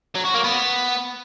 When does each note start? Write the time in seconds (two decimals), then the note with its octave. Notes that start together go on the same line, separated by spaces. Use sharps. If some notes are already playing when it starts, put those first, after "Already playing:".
0.15 F#3
0.25 F#4
0.34 A#3
0.44 B3